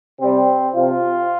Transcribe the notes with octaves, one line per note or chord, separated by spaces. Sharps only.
C3 G3 C4
C3 F3 F4